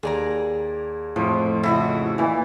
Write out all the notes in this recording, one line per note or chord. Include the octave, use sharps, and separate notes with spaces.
D#2 G#4 D5 A#5
F2 A2 F3
C#3 E4 F#4 D#5
A#2 E3 E4 E5